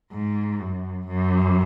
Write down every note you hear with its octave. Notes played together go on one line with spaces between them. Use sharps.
G#2
F#2
F#2